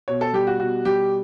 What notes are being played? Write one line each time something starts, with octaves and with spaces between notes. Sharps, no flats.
B2 C#5
A4
G3 G4
F#4
B2 F#4
G3 G4